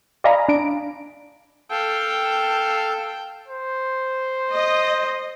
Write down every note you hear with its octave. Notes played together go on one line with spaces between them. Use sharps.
D5 D#5 F5 G#5 A#5 B5
D4 D7
A4 F5 G5
C5
D#5